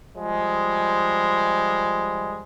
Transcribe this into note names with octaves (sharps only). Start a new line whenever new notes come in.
F3 G3 G#3